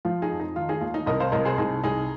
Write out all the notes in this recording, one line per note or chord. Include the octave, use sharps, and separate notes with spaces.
F3 F4
D#4 G#4
F2
D#4
D#3 F4
D#4 G#4
D#2 F4
D#4
C2 A#4 D#5
C5 F5
C2 A#4 D#5
G#4 C5
C2 D#4 G#4
C2 D#4 G#4